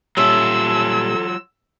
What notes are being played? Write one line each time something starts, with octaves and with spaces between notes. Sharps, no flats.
A#2 F#3 G3 C#4 F4 A4 E5 E6